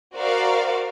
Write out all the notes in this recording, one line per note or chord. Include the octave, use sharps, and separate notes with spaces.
F#4 A#4 C5 D5 F5